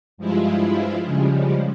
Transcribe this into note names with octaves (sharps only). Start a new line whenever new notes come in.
G2 F3 G#3 E4 F4
C#3 F3 G3 G#3